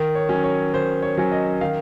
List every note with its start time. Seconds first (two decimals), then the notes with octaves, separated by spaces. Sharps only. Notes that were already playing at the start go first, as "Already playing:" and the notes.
Already playing: D#3
0.15 C#5
0.29 F#3 C#4
0.44 C#5
0.73 D#3 C5
1.02 C#5
1.17 F#3 C#4
1.32 D#5
1.61 D#3 F5